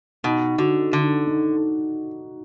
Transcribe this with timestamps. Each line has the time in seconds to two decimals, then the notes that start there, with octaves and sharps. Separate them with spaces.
0.24 B2 D#4
0.58 D3 F#4
0.92 D3 D#4
1.27 D#4